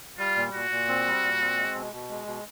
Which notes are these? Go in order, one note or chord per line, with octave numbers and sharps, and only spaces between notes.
G3 F4
A#2
A#2 F#4
A#2
C4
G3
A#2
C4
G#3
B2
B2
G#3
B2